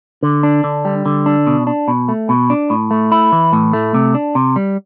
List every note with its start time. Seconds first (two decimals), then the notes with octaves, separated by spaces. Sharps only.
0.23 D3
0.43 D4
0.64 D3
0.85 G3
1.06 D3
1.26 D4
1.47 B2
1.67 D4
1.88 B2
2.08 A3
2.29 B2
2.50 D4
2.70 A2
2.91 A3
3.12 E4
3.32 E3
3.53 A2
3.73 A3
3.94 C3
4.14 D4
4.35 C3
4.56 G3